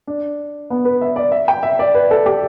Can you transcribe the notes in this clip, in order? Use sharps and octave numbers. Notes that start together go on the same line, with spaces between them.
D4
B3
B4
E5
D5
E5
G5
E5
D5
B4
A4
G4